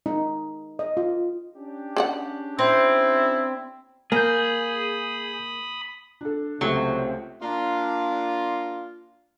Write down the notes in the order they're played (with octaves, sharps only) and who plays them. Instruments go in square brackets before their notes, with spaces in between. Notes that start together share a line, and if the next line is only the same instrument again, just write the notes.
[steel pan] D#4
D#5
F4
[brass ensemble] C#4 D4 G4
[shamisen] G#4 D5 F#5
[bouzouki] C4 [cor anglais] E4
[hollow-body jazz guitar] A#3 [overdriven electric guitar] G#4 [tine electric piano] G#5 G6 [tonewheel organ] B5 D#6
[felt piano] D4 A4
[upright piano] C#2 [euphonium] C3 [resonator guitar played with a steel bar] F#3 [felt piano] A3 G4
[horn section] A#3 D4 F4